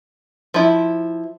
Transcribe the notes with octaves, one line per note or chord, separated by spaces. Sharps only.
F3 E4